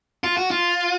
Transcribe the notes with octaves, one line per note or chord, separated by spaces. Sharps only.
F4
F#4
F4